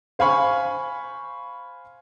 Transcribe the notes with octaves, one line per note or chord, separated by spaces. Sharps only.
C5 F5 G#5 B5 C#6